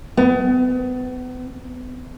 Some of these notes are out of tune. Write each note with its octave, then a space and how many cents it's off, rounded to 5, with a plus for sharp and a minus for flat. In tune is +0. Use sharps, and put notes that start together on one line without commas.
B3 +35